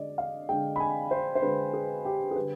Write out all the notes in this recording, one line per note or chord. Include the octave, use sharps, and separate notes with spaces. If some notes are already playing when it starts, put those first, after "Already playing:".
Already playing: D3 G#3 D5 D#5
F5
D3 G#3 G5
B5
G#5
C5
C5
D3 G#3 B4
G#4
G4
G#4
D3 G3 B4